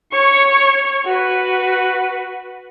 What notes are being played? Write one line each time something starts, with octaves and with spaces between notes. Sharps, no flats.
C#5 C#6
F#4 B4